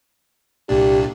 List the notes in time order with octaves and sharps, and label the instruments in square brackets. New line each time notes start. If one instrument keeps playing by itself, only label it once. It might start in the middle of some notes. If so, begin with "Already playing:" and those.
[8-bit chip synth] C2 A#2 D4 [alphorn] G4